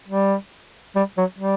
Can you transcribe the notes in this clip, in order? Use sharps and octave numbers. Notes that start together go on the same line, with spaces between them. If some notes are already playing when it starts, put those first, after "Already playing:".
G3
G3
F#3
G3